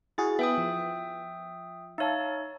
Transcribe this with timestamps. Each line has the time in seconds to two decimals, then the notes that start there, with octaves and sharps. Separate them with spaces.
0.18 E4 F#4 G#4 A6
0.39 B3 E5 G5 D#6
0.58 F3
1.98 D#4 C#5 E5 F5 A5